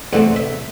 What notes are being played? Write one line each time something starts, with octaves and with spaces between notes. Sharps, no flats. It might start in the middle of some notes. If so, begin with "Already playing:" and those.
E2 D3 A3 C4 F#5
E5